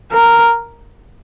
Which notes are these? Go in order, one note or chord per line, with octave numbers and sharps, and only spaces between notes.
A#4